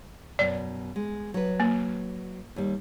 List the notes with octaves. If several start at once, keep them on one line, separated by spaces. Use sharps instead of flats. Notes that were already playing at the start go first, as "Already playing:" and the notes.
F#2 B2 D5
G#3
F#3 B4
A#3
D#2 G3